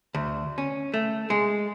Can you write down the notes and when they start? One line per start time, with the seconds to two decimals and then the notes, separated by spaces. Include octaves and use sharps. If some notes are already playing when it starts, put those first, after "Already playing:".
0.15 D2
0.58 C#4
0.94 A3
1.30 G#3